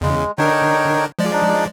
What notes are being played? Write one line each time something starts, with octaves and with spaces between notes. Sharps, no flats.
E2 C#3 G#3
D3 D4 D#4 A#4 C#5 G5
F3 G#3 D5
D4 D#4